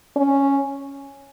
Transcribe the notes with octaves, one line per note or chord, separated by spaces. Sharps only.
C#4